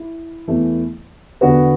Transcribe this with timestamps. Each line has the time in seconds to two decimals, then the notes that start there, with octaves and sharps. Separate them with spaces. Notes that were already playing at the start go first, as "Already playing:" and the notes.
Already playing: E4
0.48 E2 E3 A3
1.41 E2 D3 B3 F#4